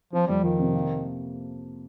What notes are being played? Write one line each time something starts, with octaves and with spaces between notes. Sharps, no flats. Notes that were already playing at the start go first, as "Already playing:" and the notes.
F3 C4
F2 G3
D#3 F3
C3
A#3